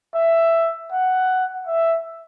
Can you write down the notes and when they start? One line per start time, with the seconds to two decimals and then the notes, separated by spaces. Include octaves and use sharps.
0.14 E5
0.92 F#5
1.67 E5